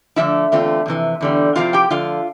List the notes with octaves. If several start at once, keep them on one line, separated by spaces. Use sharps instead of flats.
D3 F3 A3 E4 E5
E2 D3 A3 C4 F4
F2 C3 E3
E2 D3 G3
C3 F3 C4 E4 F4 F5
G4 G5
D3 F3 A3 F4 F5